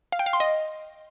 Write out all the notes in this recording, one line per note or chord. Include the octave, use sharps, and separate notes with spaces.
F5
G5
F5
C6
D#5